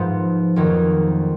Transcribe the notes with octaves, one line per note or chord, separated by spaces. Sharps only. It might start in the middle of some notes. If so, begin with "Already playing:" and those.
Already playing: G#2 F3 B3
F2 D#3 F#3 A#3 D#4